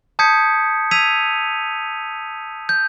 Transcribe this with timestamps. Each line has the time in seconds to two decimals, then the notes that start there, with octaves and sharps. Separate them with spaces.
0.19 A5 D#6 G6 G#6 B6 C#7
0.91 E6 G#6 B6 D#7 F7
2.69 G6